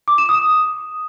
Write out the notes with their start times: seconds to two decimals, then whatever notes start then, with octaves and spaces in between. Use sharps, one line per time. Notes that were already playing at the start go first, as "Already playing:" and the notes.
0.08 D6
0.18 E7
0.29 D#6